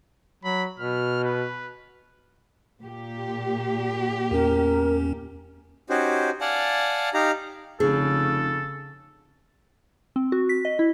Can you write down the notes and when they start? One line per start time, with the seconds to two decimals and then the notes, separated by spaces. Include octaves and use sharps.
0.44 F#3 B5
0.79 B2 F6
1.24 B4
2.82 A#2 G4
4.31 E2 C#4 A#4
5.90 C#4 D#4 F#4 G4 C5
6.41 D5 F5 F#5 G#5 A5
7.14 D#4 G4 F5 A#5
7.80 F1 C#3 G#4 A4
10.16 C4
10.32 F#4
10.49 B6
10.65 D#5
10.79 E4